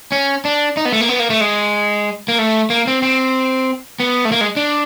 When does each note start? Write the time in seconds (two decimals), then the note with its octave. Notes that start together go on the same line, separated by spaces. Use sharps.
0.12 C#4
0.45 D4
0.77 D#4
0.85 B3
0.92 A3
1.01 A#3
1.09 B3
1.20 A#3
1.30 A3
1.41 G#3
2.28 A#3
2.39 A3
2.70 A#3
2.87 C4
3.02 C4
4.00 B3
4.25 A3
4.32 A#3
4.41 G#3
4.57 D4